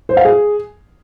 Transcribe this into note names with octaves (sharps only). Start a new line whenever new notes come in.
C5
F5
G#4